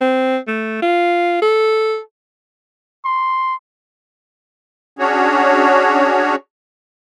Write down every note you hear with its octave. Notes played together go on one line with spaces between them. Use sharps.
C4
A3
F4
A4
C6
C#4 D4 F#4 G#4 C#5